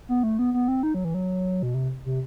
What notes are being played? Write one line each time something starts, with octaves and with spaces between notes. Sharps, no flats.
B3
A3
B3
B3
C4
D#4
F#3
E3
F#3
B2
C3
C3